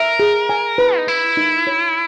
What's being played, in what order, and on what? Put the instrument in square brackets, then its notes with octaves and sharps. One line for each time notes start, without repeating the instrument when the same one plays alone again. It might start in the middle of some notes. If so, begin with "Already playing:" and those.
Already playing: [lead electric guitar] A#4 [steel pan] E5
[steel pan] G#4
G#5
B4
[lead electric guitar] D#4
[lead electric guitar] E4 [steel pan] B4
[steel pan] D#4
C#5